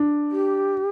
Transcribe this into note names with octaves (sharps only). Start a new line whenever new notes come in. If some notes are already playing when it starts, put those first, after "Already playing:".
Already playing: D4
G4